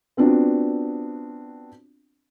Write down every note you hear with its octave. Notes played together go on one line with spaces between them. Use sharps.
B3 C4 D4 F4 F#4 D5